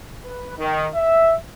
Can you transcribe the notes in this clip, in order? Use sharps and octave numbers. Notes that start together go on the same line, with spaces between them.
B4
D#3
E5